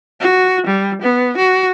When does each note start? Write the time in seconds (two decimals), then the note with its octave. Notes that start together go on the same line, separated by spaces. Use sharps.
0.21 F#4
0.67 G3
1.02 B3
1.38 F#4